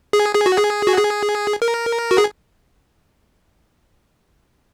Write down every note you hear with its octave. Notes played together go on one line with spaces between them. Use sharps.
G#4
G#4
F#4
G#4
F#4
G#4
A#4
F#4
G#4